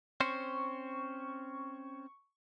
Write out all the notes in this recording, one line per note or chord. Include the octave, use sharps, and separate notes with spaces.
C4 C#4 C5 C#6